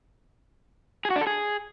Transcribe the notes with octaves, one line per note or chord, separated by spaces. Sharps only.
G#4
F#4
D4
A4
G#4